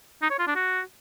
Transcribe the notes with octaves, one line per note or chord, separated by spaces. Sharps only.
D#4
C#5
F4
D4
F#4